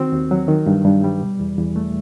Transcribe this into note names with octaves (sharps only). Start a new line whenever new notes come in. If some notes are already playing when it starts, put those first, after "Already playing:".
Already playing: D#3 C4 F#4
D#2
F#3
D#3
G2
G2
G3
B2
E2
E2
A3